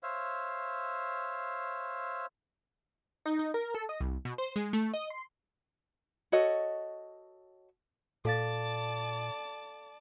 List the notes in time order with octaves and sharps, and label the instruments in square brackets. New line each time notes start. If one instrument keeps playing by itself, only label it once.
[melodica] C5 C#5 E5 F5
[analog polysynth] D#4
D#4
A#4
A4
D#5
C2
B2
C5
G#3
A3
D#5
C6
[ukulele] F#4 A4 C#5 D#5
[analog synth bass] A#2 [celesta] A4 F5 A6 [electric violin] D5 A5